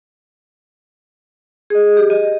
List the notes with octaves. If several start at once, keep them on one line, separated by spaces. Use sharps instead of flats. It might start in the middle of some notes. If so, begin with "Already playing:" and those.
G#4 D#5
G4
D#5